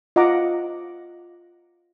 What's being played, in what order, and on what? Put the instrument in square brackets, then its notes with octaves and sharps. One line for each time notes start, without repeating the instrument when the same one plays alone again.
[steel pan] F4 D#5 F5 F#5 A#5 D6